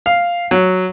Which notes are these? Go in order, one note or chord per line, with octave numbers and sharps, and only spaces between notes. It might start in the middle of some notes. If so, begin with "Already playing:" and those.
F5
F#3